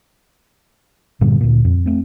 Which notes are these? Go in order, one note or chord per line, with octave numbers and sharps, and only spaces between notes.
G2 A#2 D3 G3
D2 A#2
F2
A3 C4